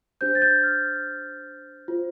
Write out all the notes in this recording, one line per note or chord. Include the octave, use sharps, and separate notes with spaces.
D4 G4 C5 G6
A6
G6
F6
F4 C5